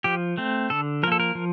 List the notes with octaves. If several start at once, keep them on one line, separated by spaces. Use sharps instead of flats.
F3 G4
A3 C4
D3 A4
F3 A#3 A4 A#4
A#4
F3